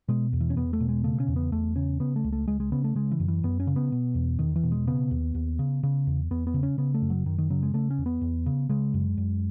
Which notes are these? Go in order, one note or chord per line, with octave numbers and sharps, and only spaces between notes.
B2 G#3
E2
E3
C#4
E2 B3
A3
B2
G#3
C#3 A3
C#4
E2
B3
E2 A3
C#3 C#4
C#3 B3
A3
C#2
A3
C#2 G#3
G#3
C#3 B3
A3
C#3 G#3
E3
F#2
E3
F#2 B3
C#4
C#3
B3
B2
E2
E2 D#3
E3
B2
G#3
C#3 B3
D#2
D#2
C#3
C#3
E2
E2 B3
B3
C#3
C#4
C#3 B3
A3
F#2
F#3
F#2 D#3
D#3
C#3 F#3
G#3
C#3 A3
C#4
E2
B3
E2
C#3
C#3 G#3
F#2
F#2